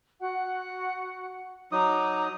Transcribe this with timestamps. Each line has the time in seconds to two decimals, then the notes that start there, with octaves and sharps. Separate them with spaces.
0.19 F#4 F#5
1.72 F#3 D#4 A#5 D6 D#6